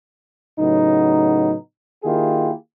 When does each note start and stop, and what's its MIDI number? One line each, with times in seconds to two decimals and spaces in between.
0.59 1.55 45
0.59 1.55 49
0.59 1.55 54
0.59 1.55 59
0.59 1.55 63
2.04 2.52 51
2.04 2.52 58
2.04 2.52 64
2.04 2.52 65
2.04 2.52 67
2.04 2.52 68